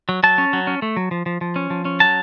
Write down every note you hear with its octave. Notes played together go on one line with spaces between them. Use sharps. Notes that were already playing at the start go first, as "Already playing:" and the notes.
F#3
F#3 A5
C#4
F#3
C#4
A3
F#3
F3
F3
F3
C#4
F3
C#4
F#3 A5